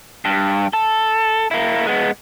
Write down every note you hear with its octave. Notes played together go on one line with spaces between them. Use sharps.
G2
A4
A#3 E4
G#3 B3